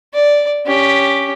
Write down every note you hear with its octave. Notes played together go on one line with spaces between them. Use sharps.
D5
C#4 G4